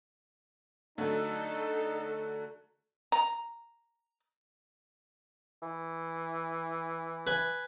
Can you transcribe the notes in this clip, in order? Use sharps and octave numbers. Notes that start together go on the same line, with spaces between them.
D3 F#3 A3 D#4 A4
A#5
E3
B4 G#5